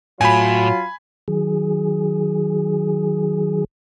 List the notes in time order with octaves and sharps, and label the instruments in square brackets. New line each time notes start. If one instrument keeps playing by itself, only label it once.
[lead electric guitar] A2 [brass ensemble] F#3 F4 [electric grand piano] G#5 B5
[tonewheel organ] D#3 F#3 G#4